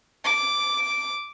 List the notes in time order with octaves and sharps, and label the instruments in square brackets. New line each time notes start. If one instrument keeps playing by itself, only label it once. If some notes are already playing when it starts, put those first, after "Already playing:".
[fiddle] D6